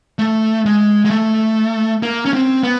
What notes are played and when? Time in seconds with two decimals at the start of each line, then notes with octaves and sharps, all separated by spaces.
0.19 A3
0.66 G#3
1.05 G#3
1.10 A3
2.03 A#3
2.25 C#4
2.33 C4
2.63 B3